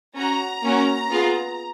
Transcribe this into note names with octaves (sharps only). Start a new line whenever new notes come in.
C#4 F#4 A#5
A#3 C#4 F#4
B3 F4 G#4